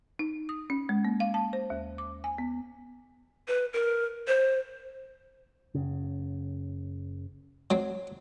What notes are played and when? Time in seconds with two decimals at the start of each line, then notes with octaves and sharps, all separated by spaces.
0.19 D#4
0.49 D#6
0.70 C#4
0.89 G#3
1.05 A#3
1.20 F5
1.34 A5
1.53 C5
1.70 D#2
1.98 D6
2.24 G#5
2.38 B3
3.48 B4
3.73 A#4
4.27 C5
5.75 F#1 C#3
7.70 F#3 C4